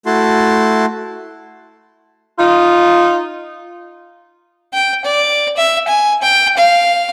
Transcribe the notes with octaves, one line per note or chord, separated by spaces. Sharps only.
A3 E4 F#4 A5 C6
D#4 F4
G5
D5
E5
G#5
G5
F5